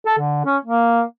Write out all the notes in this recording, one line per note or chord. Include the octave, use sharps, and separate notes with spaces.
A4
D3
C#4
A#3